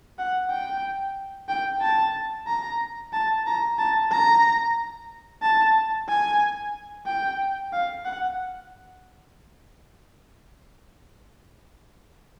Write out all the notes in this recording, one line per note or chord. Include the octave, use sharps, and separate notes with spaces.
F#5
G5
G5
A5
A#5
A5
A#5
A5
A#5
A5
G#5
G5
F5
F#5